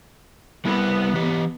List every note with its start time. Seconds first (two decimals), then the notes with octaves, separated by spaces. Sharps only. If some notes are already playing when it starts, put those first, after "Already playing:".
0.65 G3 B3 E4
1.14 E3 G4